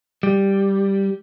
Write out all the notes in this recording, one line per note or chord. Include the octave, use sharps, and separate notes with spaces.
G3